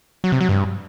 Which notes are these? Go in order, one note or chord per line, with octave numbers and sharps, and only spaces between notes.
F#3
C3
F#3
G2